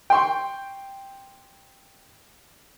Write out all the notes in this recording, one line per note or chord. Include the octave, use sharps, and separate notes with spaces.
G5 C6 C#6